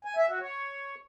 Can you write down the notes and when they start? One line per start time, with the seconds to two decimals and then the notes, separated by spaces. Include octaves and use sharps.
0.05 G#5
0.16 E5
0.28 F#4
0.39 C#5